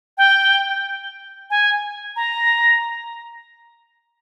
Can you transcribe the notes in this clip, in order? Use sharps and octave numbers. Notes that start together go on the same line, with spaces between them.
G5
G#5
A#5